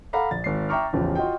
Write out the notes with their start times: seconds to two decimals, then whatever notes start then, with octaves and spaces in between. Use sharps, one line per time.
0.13 A4 F5 F#5 A#5 B5 D6
0.31 A#1 A6
0.44 G#1 C7
0.69 E5 G5 A#5 C#6 D6 F6
0.93 A1 E2 C#3 F3
1.15 F4 F#4 D#5 G5